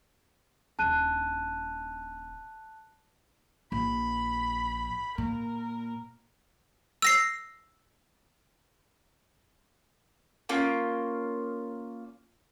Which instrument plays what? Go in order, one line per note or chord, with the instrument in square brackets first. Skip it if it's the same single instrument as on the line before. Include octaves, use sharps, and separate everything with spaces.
[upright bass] D#1 D4 [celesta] A5 F#6 D#7
[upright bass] A#1 [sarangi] B5
[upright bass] A#2 [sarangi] A#4
[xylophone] E6 A#6 C7
[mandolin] A#3 C#4 F4